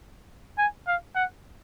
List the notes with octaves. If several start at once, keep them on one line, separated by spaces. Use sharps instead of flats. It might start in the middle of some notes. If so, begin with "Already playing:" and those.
G#5
F5
F#5